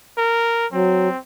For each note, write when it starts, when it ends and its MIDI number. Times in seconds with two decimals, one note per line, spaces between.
0.18 0.66 70
0.72 1.08 54
0.72 1.18 60